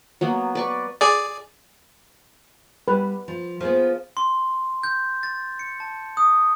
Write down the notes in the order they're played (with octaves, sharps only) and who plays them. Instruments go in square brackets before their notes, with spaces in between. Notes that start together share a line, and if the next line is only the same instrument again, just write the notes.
[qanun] F#3 A#3 B3
B4 D5 C#6
[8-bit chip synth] G#4 D5
[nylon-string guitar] G3 [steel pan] B4
[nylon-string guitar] F3
[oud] F3 [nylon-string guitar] B3 G#4 C5
[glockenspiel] C6
G6
A6
C#7
A5
D#6